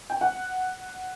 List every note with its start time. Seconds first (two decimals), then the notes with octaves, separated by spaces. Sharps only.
0.10 G5
0.21 F#5